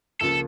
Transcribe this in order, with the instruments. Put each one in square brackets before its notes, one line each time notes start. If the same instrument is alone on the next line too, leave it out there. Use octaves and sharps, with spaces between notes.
[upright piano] C#2 C#3 F3 A#3 [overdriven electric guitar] A4